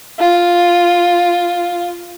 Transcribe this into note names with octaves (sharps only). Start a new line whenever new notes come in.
F4